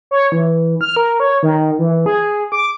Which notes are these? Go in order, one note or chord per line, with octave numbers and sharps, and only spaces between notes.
C#5
E3
F6
A#4
C#5
D#3
E3
G#4
D6